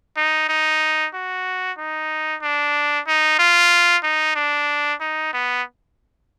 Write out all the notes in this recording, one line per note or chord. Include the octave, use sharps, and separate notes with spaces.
D#4
D#4
F#4
D#4
D4
D#4
F4
D#4
D4
D#4
B3